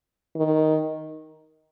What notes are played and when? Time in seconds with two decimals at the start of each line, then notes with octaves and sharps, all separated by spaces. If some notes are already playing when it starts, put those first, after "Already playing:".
0.36 D#3